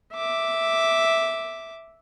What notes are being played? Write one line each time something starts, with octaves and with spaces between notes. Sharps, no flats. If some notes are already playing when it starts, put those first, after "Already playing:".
E5 D6